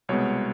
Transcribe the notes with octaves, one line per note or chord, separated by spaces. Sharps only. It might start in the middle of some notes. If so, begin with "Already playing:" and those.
C2 B2 G#3 B3 C#5